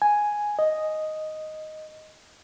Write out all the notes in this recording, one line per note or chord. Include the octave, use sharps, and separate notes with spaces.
G#5
D#5